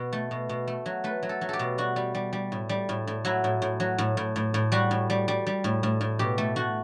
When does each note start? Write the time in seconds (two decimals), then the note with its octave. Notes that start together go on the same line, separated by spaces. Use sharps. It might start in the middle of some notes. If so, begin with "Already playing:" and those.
Already playing: B2
0.13 A3
0.31 B2
0.49 B2
0.67 A3
0.86 F#3
1.04 A3 B4
1.23 F#3
1.29 A4
1.41 F#3
1.49 G4 A4
1.59 B2
1.78 G3 F#4
1.96 G3
2.15 G3
2.33 G3
2.52 A2
2.69 G3
2.89 A2
3.07 A2
3.25 F#3 E4
3.44 A2
3.62 A2
3.80 F#3
3.98 A2
4.17 A2
4.36 A2
4.54 A2
4.72 G3 F#4
4.91 A2
5.10 G3
5.28 G3
5.47 G3
5.64 A2
5.83 A2
6.01 A2
6.19 B2 G4
6.38 A3
6.56 A3 F#4